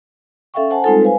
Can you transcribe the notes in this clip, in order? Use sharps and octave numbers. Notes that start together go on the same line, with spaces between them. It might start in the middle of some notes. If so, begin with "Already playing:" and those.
C#4 A4 E5 F5 G5 C#6
C5 F#5 G#5 A5
G3 G#3 C4 D#4 F4 A4
B4 C5 F5 G#5